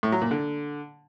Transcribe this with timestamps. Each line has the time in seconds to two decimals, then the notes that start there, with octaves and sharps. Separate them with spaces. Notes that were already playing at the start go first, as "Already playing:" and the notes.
0.03 A2
0.12 F#3
0.22 A#2
0.31 D3